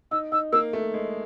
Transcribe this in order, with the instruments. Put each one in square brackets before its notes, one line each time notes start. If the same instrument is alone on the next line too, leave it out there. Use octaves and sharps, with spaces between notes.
[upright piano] D#4 [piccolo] E6
[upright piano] D#4 [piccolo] E6
[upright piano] A#3 [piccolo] E6
[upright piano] A3
G#3